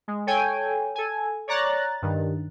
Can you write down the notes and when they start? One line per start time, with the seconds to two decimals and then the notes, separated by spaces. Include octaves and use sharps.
0.08 G#3
0.27 A4 C#5 G5 G#5
0.95 A4 G#5
1.48 C#5 D5 A#5 F#6 A6
2.02 G2 D#3